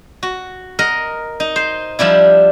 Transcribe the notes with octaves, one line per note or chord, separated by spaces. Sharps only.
F#4
A#4 D#5 F#5
D#4
C5
F3 G3 D4 E4